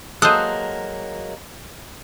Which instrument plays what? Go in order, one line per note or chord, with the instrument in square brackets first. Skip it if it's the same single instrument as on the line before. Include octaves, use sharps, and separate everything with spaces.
[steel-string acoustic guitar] F#3 G#3 A#3 [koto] A4 C5 [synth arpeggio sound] D#6 F#6